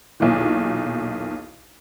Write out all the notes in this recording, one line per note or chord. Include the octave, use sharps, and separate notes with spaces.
B1 E2 A#2 D#3